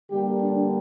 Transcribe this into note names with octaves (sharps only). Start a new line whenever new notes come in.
D3 G3 A#3 G4
D4